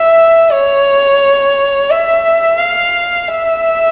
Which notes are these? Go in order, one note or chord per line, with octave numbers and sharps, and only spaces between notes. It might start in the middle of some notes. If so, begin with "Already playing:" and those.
Already playing: E5
C#5
E5
F5
E5